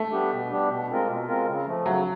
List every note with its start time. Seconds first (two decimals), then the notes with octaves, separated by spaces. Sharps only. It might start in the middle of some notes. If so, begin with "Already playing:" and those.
Already playing: A3
0.12 G3 B3 D4 G4
0.31 B2
0.50 G3 B3 D4 G4
0.70 B2
0.89 G#3 C4 F4 A#4
1.07 B2
1.27 G#3 C4 F4 A#4
1.47 C#3
1.66 F3 A3
1.85 C#3 F#3